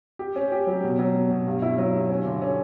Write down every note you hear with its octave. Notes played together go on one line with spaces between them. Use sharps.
G4
C#4
G4
F#3
B2
F#3
B2
B2
G2
E4
F#3
G2
C#4
D3
C#4